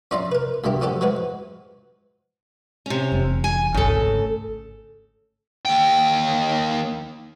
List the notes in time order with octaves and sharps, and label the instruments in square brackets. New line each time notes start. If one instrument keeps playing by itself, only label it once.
[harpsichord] C#4 F4 D5 E5 A#5 C6
A#4 B4
D2 G2 A#3 E4 G4
D3 F3 F#4 G4 A4
E3 F3 G#3 F#4 B4
[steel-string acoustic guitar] C3 C#4
[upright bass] F1 E3
[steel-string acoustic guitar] G#5
[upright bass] G#1 D2 [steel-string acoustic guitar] C#3 A4
[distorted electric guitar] D#2 G5